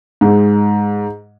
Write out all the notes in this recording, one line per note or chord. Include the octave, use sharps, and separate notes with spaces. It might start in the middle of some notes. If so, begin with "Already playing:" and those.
G#2